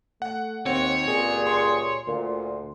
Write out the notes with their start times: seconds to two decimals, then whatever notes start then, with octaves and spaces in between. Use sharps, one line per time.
0.22 A3 F#5
0.66 D#2 C4 C#5 F#5
1.07 C#2 A#2 G3 G#4
1.47 C6 C#7
2.07 D2 A#2